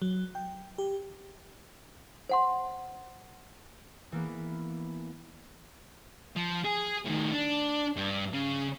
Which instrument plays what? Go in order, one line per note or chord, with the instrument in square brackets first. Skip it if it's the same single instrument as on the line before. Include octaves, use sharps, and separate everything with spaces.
[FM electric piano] F#3
G5
G4
[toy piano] C5 F#5 C6
[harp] E3 A#3 B3
[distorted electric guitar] F3
G#4
A2 D#3
D4
G2
C#3